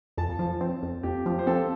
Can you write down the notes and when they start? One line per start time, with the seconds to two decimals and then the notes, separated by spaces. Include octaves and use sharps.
0.18 F2 A5
0.39 F3
0.61 C4
0.83 F2
1.03 F2 G4
1.26 F3
1.39 C5
1.47 C4 A4